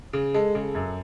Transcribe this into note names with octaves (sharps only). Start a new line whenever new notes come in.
C#3
G#3 A4
C#3
F#2